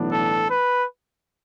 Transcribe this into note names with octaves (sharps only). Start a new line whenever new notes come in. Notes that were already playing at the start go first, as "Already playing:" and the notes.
Already playing: B1 A2 E3 B3 D4
A4
B4